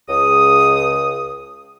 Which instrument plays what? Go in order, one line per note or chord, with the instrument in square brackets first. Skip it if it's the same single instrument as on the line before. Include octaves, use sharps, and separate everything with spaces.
[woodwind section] C#2 D#6